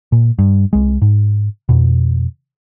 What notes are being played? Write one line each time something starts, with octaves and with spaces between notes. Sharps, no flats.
A#2
G2
C2 G#3
G#2
F2 B2